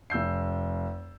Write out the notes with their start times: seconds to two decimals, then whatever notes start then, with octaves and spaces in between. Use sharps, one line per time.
0.10 F1 E6 G6 C7